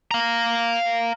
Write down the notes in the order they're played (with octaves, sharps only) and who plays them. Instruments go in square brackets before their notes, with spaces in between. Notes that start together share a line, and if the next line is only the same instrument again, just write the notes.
[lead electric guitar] F5 A#5